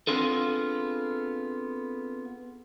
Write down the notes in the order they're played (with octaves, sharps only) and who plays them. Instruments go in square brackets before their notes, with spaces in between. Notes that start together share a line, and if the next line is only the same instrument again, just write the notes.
[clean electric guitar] B3 C4 D4 F4 G#4 A4